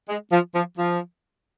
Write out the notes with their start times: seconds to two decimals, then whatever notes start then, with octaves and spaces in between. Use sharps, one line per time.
0.09 G#3
0.32 F3
0.55 F3
0.78 F3